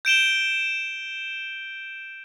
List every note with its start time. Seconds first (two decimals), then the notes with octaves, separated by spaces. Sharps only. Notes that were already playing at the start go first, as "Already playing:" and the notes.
0.05 G6 D7 E7 G7